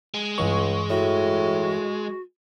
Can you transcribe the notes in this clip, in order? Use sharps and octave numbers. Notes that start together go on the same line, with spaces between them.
G#3
C#2 G2 E3 C#6
A2 F#4